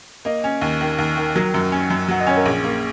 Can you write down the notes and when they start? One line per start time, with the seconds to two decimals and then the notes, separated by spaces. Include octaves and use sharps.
0.25 A#3 D#5
0.44 C#4
0.61 D#2
0.81 D#3
0.98 D#2
1.17 D#3
1.35 F#3 A#4
1.54 F#2
1.72 C#4
1.90 F#2
2.09 F#3 F#5
2.20 D#5
2.27 C#4 C#5
2.37 A#4
2.45 A#1 G#4
2.64 A#3